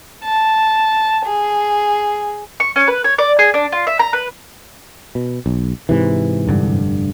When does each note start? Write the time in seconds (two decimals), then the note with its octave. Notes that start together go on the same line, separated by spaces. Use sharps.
0.24 A5
1.25 G#4
2.60 C#6
2.76 C#4
2.88 B4
3.04 C#5
3.18 D5
3.39 G#4
3.54 D4
3.72 F4
3.87 E5
3.99 A#5
4.13 B4
5.15 B2
5.46 B1
5.89 G#2 C3 E3
6.47 F1 G2 D3